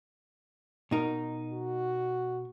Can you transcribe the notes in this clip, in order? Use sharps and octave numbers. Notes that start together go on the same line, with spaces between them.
B2 D#4 A#4
F#4